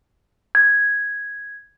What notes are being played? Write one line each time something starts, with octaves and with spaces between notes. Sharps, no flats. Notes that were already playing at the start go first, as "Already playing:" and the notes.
G#6